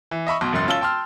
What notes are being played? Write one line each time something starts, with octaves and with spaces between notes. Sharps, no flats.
E3
D#5 E5 B5 C#6
B1 B2 C6
E1 F#2 C#3 B3 C6 A6
C#4 F4 A5 E6 A6 G7
G5 A5 C6 E6 F6